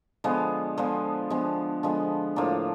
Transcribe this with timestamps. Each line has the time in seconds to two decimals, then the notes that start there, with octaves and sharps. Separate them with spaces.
0.24 D3 F3 G#3 B3
0.78 D3 F3 G#3 B3
1.30 D3 F3 G#3 B3
1.83 D3 F3 G#3 B3
2.36 A2 F3 A#3 D4